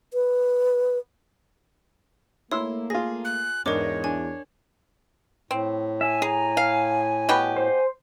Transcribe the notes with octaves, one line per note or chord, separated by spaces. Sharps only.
B4
A3 A#3 E4 C#5 C6 E6
F4 G#4 A#6
F#6
E2 G#2 D4 D#4 A#4 C#5 D6
D4 G#5
A2 C4
E5 G#5
G#4 A#5
F5
B2 B3 G4
C5